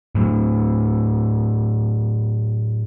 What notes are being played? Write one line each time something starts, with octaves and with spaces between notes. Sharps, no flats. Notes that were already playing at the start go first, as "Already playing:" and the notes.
A2 F#3